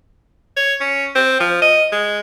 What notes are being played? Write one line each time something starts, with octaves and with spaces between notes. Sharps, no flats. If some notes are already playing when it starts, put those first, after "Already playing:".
C#5
C#4
C4
F3
D#5
G#3